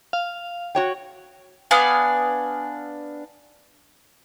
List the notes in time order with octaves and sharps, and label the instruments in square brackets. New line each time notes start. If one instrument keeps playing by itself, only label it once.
[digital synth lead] F5
[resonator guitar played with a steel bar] F#4 C#5 G5
[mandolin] B3 D4 F5 G#5